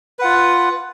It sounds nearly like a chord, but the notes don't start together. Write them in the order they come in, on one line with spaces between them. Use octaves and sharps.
B4 F#5 F4